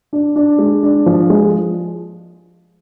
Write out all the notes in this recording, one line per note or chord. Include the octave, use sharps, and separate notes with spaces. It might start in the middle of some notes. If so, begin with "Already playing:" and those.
D4
D4
G#3
D4
F3
G#3